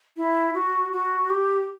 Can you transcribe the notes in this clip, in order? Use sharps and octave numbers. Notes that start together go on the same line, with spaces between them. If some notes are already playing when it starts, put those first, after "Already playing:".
E4
F#4
F#4
G4